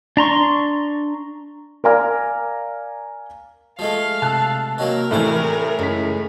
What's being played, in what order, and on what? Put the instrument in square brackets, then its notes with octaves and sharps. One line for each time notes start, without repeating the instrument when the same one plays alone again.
[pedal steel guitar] D4 A#5 C6 C#6
[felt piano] A#4 D5 F5 G#5 A#5 F6
[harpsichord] F3 G#3 A3 [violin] F5
[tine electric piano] C3 E6 [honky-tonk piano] A5 F#6
[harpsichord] D#3 F#3 A#3 [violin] A#4
[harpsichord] C2 C5 A5 [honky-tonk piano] A2 E3
[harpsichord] C#2 [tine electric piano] F#2 B6